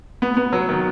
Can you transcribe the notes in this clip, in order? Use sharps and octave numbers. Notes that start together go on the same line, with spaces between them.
B3
B3
F#3
D#3